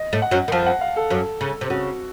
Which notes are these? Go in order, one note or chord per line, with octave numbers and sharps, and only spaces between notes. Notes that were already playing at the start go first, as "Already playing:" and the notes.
Already playing: D#5
A2 A3
F#5
F#2 F#3
D#3
F2 F3 A5
F#5
F5
A4
F#2 F#3
C#3
C3
C#3 F#4